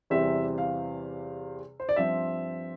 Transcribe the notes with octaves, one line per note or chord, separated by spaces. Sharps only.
E2 C3 E3 G3 C4 E5
F5
C5
D5
G2 F3 C4 E5